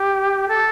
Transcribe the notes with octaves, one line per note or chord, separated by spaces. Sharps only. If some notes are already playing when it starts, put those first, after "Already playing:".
Already playing: G4
A4